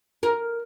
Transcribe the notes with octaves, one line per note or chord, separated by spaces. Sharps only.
A#4